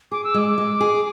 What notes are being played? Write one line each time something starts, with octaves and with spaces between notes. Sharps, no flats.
G#4 D6
E6
G#3 D6
G#3
G#4